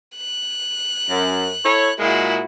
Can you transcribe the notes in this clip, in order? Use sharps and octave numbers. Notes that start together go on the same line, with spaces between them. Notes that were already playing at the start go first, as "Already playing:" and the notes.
F#6
F#2
E4 A4 C#5
A#2 G#3 E4 F#4